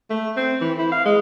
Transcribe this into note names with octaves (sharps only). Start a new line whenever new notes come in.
A3
C4
E3
E4
F5
G#3